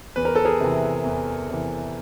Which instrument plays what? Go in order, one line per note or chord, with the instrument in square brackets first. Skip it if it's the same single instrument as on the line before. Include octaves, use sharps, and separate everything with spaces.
[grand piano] E2 B4
A#4
A4
G#4 A#4
C3 E3
E2
C3 E3